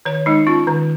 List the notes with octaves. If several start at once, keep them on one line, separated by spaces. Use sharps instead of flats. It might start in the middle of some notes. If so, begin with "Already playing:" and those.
D#3 C#5
G#3 D#4
C#4 F4
D#3